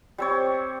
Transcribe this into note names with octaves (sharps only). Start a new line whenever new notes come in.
G3 C4 C#5